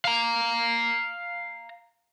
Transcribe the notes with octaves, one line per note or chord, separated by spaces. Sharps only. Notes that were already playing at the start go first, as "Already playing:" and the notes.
F5 A#5